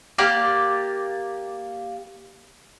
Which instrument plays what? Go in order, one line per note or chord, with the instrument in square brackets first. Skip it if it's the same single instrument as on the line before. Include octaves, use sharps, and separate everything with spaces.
[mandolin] A#3 G4 D5 F5